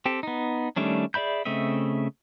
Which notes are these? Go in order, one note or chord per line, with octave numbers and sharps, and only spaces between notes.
C4 G4 A4
B3 D#4
D#3 G3 A3 C#4 D4
G#4 D5 E5 B5 G6
C#3 A3 C4 D#5 E5